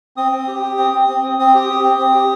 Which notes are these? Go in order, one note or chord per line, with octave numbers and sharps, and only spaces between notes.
C4 D#6
C4
G4
G4
C4
C4
C4
C4
C4 D#6
G4
G4
C4
C4
G4